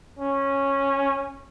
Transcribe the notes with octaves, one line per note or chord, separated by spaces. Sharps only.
C#4